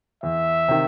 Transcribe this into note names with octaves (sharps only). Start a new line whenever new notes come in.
E2 E5
C3 D#3